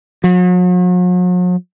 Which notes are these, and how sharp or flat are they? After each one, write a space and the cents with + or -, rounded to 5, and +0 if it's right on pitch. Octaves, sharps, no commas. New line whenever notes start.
F#3 -45